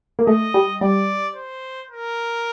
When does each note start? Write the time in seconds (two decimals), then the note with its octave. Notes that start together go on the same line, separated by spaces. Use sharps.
0.19 A#3
0.26 A3 D#5
0.54 G3
0.81 G3 D5
1.35 C5
1.91 A#4